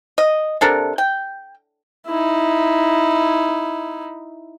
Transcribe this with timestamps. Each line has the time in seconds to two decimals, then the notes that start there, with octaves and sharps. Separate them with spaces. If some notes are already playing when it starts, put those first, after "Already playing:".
0.18 D#5
0.61 C3 D4 A4 A#4
0.98 G5
2.07 D#4 E4